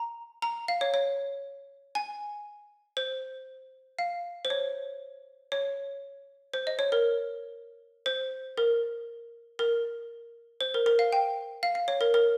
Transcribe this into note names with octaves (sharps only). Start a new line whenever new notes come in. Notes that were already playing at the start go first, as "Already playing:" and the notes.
Already playing: A#5
A#5
F5
C#5
C#5
G#5
C5
F5
C5
C#5
C#5
C5
D#5
C#5
A#4
C5
A#4
A#4
C5
A#4
A#4
F5
G5
F5
F5
C#5
A#4
A#4